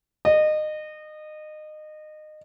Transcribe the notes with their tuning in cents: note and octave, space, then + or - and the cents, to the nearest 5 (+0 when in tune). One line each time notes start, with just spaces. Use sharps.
D#5 -25